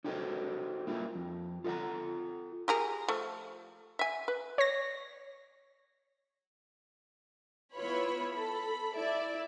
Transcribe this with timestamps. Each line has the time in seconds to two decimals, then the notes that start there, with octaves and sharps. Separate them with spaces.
0.04 D#4 F#4 G4 A4 C5 D#5
0.87 A#3 E4 F4 G4
1.15 F2
1.64 F4 A4 D#5 F#5 A#5
2.68 G4 G#4 A#4
3.08 F3 A3
3.99 E5 G#5
4.28 B4
4.58 C#5 A#6
7.75 B3 E4 F4 B4 C#5 B5
8.33 A4 B5
8.96 E4 D5 E5